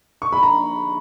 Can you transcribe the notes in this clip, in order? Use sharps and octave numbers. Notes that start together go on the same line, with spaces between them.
C#6
B5
A#5